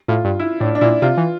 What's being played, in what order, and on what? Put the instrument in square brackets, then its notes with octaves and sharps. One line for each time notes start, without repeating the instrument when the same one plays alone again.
[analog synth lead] A2 [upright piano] F4
[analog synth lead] G2
[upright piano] E4
[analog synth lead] A2 [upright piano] D4
[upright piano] D4
[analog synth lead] A#2 [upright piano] E4
[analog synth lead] C3 [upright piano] F4
[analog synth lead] E3